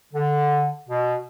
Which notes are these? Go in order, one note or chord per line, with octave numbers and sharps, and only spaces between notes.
D3
B2